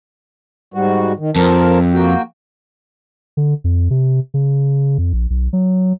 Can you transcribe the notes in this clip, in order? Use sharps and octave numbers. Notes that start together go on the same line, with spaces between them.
G#2 G3 F#4
D#3
F2 F3 A#4 A5
A#3 F#4 G5
D3
F2
C3
C#3
F2
A#1
B1
F#3